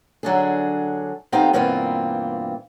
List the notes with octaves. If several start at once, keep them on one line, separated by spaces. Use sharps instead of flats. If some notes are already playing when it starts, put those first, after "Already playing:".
D3 F#3 D4 G#4
F2 B3 C4 D#4 G4 F5
G2 B2 E3 A#3 C4 F4